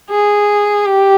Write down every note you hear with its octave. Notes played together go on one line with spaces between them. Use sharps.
G#4
G4